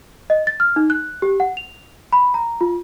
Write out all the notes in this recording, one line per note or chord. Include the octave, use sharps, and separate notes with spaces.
D#5
A6
F6
D#4
F#6
G4
F#5
F7
B5
A#5
F4